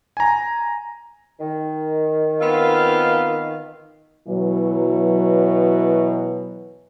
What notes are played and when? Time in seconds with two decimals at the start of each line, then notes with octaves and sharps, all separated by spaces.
0.17 G#5 A#5
1.40 D#3
2.41 B3 C4 F4 F5
4.27 B2 E3 F#3